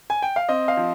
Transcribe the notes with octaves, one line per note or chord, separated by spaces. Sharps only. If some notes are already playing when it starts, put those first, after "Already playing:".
G#5
G5
F5
C4 D#5
F5
F3